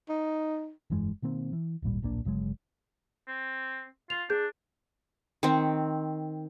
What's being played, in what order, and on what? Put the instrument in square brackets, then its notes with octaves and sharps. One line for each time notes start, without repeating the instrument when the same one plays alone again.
[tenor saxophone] D#4
[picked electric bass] F1 G2 E3 G#3
B2 D#3 A#3 C4
E3
D1 G#1 A#2 G3
D1 A#1 A#3 D4
G1 C#3 F#3 G#3
[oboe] C4
[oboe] F4 [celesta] F7
[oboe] D4 [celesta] G#4 G6
[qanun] D#3 C4